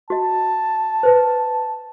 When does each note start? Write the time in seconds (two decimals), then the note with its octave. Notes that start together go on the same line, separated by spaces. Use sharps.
0.10 F#4 D#5 A5
1.03 B4 C5